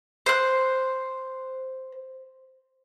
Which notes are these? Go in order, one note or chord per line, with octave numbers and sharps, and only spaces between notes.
C5 F#6